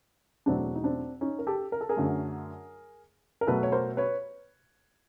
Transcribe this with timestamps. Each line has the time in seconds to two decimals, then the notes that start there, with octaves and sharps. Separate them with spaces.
0.46 E2 B2 F#3 A3 C4 D4
0.76 D#4
0.84 C4 D4
1.21 C#4 D#4
1.39 A#4
1.47 G4 A4
1.72 A#4
1.81 A4
1.89 G#4 A#4
1.97 F#2 D3 F#3 A3
3.41 A#4
3.47 B2 F#3 A3 A4 B4
3.63 C#5
3.72 A#4 C5
3.97 B4 C#5